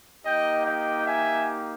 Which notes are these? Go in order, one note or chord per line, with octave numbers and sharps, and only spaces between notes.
A#3 D#4 G4 D#5 G5
D#5 G5
E5 G#5